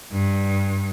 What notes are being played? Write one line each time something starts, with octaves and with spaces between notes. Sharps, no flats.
G2